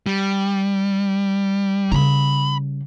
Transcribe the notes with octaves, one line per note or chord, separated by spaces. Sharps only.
G3
C#3 G3 A#5 B5